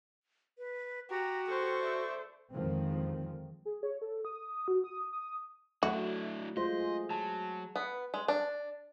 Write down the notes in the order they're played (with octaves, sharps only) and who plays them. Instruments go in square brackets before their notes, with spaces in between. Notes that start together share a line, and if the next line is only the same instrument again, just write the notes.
[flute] B4
[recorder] F#4 [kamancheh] G4 [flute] A#5
[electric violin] A4 C5 [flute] C#6
[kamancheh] D5 E5
[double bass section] F2 D3 D#3 F3 G#3 C4
[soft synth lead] G#4
C#5
A4
D#6
F#4
D#6
D#6
[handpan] F#3 A3 [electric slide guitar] D4 E4 [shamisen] F#4
[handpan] G#3 C5 [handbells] F4 [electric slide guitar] D#5
[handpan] G#4
[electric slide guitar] F#3 [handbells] A5
[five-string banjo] B3
G#3
D4